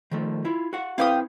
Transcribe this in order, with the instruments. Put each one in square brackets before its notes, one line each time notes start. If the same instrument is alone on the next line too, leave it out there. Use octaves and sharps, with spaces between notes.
[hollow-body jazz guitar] D#3 F3 A3
E4 F4
F#4 F5 F#5
[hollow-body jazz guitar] C4 E4 B4 [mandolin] F5 G5 D#6